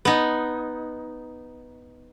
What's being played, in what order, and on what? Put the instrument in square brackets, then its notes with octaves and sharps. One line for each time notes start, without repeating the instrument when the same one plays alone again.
[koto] B3 D#4